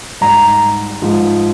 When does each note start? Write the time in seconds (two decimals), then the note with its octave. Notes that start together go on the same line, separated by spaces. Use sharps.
0.21 G#2 G3 A#5
1.02 G#2 F3 G#3